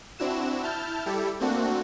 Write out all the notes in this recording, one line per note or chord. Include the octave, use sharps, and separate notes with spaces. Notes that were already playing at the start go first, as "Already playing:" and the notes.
C4 D4 E4 F#4 E7
E4 A5 F6 G6
G3 E4 G4 A4
A3 A#3 C4 D4 F#4